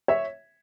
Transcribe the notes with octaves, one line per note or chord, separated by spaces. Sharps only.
C#5 E5